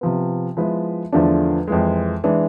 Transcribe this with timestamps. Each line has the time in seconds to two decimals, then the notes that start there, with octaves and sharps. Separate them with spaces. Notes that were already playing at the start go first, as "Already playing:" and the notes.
0.01 C3 F3 B3
0.57 F3 G#3 B3 E4 B4
1.12 E2 D3 F3 A3 D4
1.68 F2 E3 G#3
2.24 E3 G#3 D4